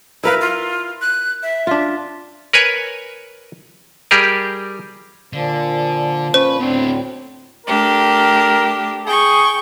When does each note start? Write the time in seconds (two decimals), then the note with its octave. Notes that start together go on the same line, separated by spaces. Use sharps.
0.24 E4 A#4 B4 F5
0.41 F4
1.01 F#6
1.43 E5
1.67 D4 F4
2.53 A#4 B4 C#5 G#5
4.11 G3 G4 G#4 A#4
5.33 A#2 D3 F3
6.34 C#4 B4 C5
6.60 D2 A2 B3 C4 D4
7.66 A3 D4 G4 A#4
9.06 G#4 G5 C#6